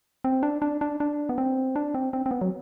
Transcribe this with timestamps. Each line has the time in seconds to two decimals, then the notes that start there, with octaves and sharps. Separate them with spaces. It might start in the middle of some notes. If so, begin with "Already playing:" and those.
0.24 C4
0.43 D4
0.62 D4
0.81 D4
1.00 D4
1.29 B3
1.38 C4
1.76 D4
1.94 C4
2.13 C4
2.26 C4
2.31 B3
2.41 F#3